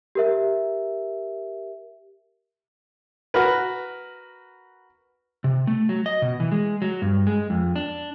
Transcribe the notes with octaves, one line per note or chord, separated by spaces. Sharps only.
G4 A#4 E5
F#4 A#4 B4
C3
A3
F#3
D#5
B2
E3
G#3
F#3
G2
G#3
F2
D4